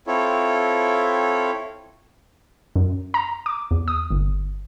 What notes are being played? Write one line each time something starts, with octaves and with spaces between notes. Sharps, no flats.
C4 E4 F4 A4 C#5
F#2
A#5
D6
E2
D#6
G1